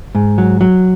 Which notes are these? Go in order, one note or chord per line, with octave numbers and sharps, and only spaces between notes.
G#2
F#3
F#3